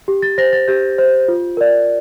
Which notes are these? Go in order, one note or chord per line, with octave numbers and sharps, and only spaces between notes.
G4
A6
C5 A#6
A6
G4 G6
C5
F4
A#4 D5